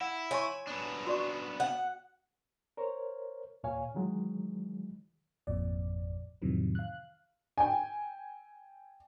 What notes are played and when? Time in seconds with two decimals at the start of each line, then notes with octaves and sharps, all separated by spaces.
0.01 E4 F#5
0.31 C#5 G#5 C6 C#6
0.67 B3 D4
1.07 F#4 D5 C#6
1.60 F#5
2.77 A#4 C5 C#5
3.63 D#2 A#2 C#5 F5 G#5
3.95 D#3 E3 F#3 G#3
5.47 G#1 F2 A#2 D5
6.42 F2 A2 C3 D#3 E3 F#3
6.75 F5 F#6
7.58 G5 G#5